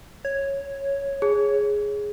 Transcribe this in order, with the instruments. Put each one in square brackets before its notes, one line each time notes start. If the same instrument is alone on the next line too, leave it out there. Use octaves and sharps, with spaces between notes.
[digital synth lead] C#5
[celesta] G#4